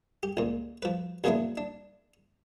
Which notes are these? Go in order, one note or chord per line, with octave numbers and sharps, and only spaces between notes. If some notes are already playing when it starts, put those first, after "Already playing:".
G4
C#2 A#2
F3 B4
F#2 C#3 A#3 B3 D4 E4
D4